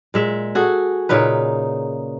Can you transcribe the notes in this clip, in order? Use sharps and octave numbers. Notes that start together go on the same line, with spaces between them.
A#2 G#3 E5
F#4 G#4 A4
A#2 C#3 D#4 B4